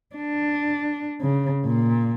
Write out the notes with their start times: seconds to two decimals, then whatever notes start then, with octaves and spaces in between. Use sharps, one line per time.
0.16 D4
1.22 C#3
1.65 A#2